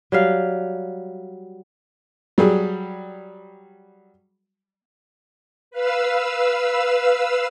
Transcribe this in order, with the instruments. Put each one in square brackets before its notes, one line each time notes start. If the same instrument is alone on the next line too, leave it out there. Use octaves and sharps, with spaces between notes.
[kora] F#3 G3 F5
[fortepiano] F#3 G3 G#4
[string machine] B4 F5 E6